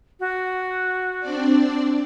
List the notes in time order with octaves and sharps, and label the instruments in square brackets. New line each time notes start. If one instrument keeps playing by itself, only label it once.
[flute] F#4
[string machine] C4 D4 D5